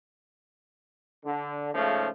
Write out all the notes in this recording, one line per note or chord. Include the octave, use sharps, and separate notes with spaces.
D3
G#2 C#3 F3 A3